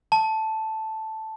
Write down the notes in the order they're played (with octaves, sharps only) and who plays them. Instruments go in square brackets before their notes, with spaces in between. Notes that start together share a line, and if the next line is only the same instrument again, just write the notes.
[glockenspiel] A5